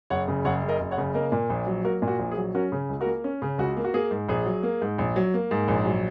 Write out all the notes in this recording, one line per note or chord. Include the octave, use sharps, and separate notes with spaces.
F#1 C#5 F#5
C#3
F#1 C#5 F#5
F#2
A#4 D#5
F#1
C#5 F#5
C#3
A#3 A#4 D#5
A#2
A#1
F#3
A#3 F#4 A#4
A#2
F#4
A#1
G#4
F#3
C#4 F#4 A#4
C#3
C#2
F#4 A#4
A#3
C#4
C#3
C#2 F#4
A#3
F#4
A#3 G#4
G#2
A#1 G#4
F#3
A#3
G#2
A#1
F#3
A#3
G#2
A#1
F#3